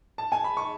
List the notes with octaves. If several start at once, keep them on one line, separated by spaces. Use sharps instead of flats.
A5
G#5
B5
C#6